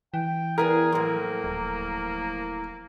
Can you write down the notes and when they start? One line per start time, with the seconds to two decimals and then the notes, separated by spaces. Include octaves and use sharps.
0.14 E3 G5
0.58 E2 B3 E4 G#4 A#4
0.92 A2 F3 F#3 A#3 C5
1.44 D#1